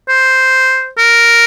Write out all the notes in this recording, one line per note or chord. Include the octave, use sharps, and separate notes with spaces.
C5
A#4